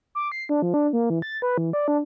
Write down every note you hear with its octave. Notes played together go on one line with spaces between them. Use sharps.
D6
C7
D4
F3
D4
A#3
E3
A6
B4
E3
D5
D4